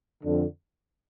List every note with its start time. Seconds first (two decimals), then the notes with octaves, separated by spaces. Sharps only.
0.22 F2 D3